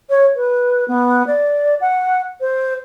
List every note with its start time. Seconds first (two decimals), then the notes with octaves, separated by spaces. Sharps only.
0.09 C#5
0.35 B4
0.88 B3
1.26 D5
1.80 F#5
2.40 C5